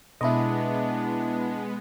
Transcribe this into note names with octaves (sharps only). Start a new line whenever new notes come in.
B2 G#3 B3 D4 E4 D#5 B5